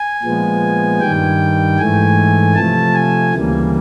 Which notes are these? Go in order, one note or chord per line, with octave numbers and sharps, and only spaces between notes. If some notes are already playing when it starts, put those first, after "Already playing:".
Already playing: G#5
A#2 F3 G#3 B3
G2 D#3 G3 G5
G#2 E3 A3 G#5
C3 F3 A3 A5
G#5
D2 C#3 E3 G3 A#3